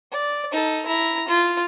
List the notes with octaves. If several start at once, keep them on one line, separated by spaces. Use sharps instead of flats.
D5
D#4 A4
E4 A#5
F4